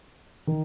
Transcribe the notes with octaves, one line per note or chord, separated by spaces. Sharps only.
D#3